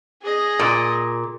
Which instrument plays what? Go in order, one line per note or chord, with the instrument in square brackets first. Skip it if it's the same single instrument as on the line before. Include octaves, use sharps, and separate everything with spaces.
[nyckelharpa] G#4 D#5
[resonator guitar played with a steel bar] A#2